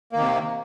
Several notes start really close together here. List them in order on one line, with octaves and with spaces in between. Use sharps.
A#3 D#3 C3